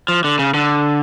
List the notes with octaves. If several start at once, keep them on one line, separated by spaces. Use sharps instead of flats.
F3
D3
C#3
D3